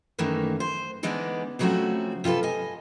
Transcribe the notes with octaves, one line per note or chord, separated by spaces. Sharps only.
F#2 D#3 E3 A3 A#3
C5
D3 E3 G#3 B3 D4 D#4
C#3 F3 F#3 A3 C4 F#4
C3 F4 G4 A4 B4
D#5 G#5